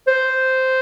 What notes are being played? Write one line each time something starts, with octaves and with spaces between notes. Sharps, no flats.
C5